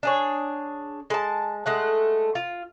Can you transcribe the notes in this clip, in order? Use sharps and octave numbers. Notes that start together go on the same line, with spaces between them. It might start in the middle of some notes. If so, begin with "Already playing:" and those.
D4 G#4 C#5
G#3 A5
G#3 A3 F#5
F4